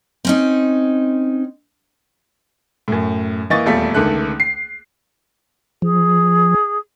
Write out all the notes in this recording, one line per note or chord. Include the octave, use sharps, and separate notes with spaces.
C4 C#4 D#4
F#2 A2
E3 A#3 D#5 C#6 A6
D#1 E2 G3 A3 F4 B6
C#2 D3 D#3 A3 F#6
C7
F3 G#4